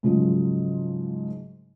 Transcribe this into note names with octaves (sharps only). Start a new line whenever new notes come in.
G#2 C#3 F3 F#3